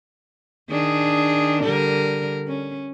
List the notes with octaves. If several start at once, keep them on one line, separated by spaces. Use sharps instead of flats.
D#3 D4 G#4
D3 G3 A#4
C#4